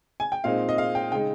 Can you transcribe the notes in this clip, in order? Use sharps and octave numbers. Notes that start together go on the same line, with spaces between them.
G#5
G5
A#2 G#3 C4 D#4 F5
D#5
F5
G5
C#3 G#3 D#4 G5